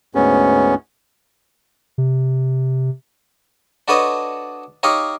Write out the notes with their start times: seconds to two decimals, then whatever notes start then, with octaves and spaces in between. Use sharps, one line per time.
0.15 D2 G#2 B3 C#4
1.98 C3
3.88 D4 F#4 A4 B4 C#5 D#5
4.83 D#4 G4 C#5 D#5 F5 C#6